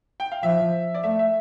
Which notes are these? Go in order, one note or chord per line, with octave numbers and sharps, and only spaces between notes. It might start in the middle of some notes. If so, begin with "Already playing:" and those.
G5
F5
F3 E5
D5
A3 E5
E5